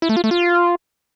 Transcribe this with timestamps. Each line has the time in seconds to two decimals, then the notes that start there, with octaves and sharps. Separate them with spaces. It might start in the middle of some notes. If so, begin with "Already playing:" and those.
0.02 E4
0.09 A3
0.17 F4
0.24 A3
0.31 F4